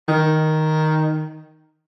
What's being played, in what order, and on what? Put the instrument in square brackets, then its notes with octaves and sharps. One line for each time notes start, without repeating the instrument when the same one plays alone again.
[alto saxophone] D#3